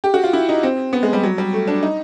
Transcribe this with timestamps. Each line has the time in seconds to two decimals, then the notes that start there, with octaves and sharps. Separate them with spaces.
0.04 G4
0.14 F#4
0.24 F4
0.33 E4
0.49 D#4
0.63 C4
0.93 B3
1.03 G#3
1.13 G3
1.23 F#3
1.38 G3
1.53 A3
1.68 D4
1.83 D#4